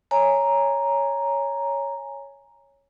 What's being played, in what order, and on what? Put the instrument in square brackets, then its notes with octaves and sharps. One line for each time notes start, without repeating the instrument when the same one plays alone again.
[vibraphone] C#5 G#5 A#5